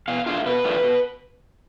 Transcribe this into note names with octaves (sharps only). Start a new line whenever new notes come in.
B2 F5
A3 D4 F4 F5
B2 B4
A3 D4 F4
B2